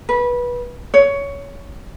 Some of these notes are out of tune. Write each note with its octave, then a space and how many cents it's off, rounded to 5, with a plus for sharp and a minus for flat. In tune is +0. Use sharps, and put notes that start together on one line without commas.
B4 -20
C#5 +15